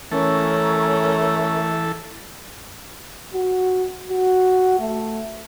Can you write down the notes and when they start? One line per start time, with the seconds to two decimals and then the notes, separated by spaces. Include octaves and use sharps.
0.12 E3 A3 C#4 A4 A#4 C#6
3.33 F#4
4.10 F#4
4.79 A3